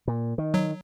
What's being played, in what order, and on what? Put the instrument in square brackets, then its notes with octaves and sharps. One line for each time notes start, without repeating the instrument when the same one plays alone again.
[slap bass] A#2
D#3
[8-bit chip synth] F#3